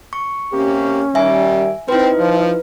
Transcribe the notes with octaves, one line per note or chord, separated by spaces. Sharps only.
C#6
C3 A#3 C#4 G4
D#3 G3 E5 G#5
C4 D#4 E4 B4
F3